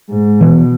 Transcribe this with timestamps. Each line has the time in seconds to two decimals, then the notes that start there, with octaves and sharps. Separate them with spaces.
0.09 G#2
0.40 B2 E3 B3